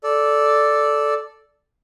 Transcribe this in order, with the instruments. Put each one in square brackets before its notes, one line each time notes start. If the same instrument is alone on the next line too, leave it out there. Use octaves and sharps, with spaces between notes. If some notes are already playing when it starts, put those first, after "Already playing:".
[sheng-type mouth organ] A4 D5